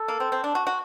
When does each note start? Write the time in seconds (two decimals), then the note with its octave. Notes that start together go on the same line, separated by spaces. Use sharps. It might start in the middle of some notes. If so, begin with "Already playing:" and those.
Already playing: A4
0.08 A#3
0.20 C4
0.32 C4
0.44 D4
0.55 F#4
0.67 F#4